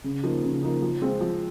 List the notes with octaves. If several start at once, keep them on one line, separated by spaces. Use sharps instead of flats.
C#3
F3 A#3 D#4
C#3
F3 A#3 D#4
F3
G#3 C4 F4
F3